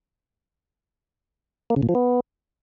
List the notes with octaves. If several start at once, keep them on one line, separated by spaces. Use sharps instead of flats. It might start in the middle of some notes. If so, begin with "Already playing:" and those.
A#3
C#3
A#2
F3
B3